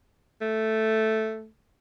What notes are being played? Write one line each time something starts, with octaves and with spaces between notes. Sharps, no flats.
A3